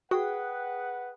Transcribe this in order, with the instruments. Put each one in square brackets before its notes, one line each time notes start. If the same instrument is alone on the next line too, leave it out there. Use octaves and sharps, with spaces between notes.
[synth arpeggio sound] F#4 [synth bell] G#4 G5 D#6 [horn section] B4 F#5